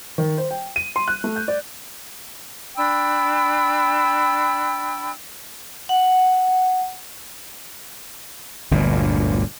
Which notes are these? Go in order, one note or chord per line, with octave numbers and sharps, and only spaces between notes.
D#3
C5
G5
D#7
C6
F#6
A3
G6
D5
D4 G5 B5 E6
F#5
G1 D2 A#2